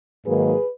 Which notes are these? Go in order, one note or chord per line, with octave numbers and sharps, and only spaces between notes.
G#2 D#3 F#3 A#3 G#4 B4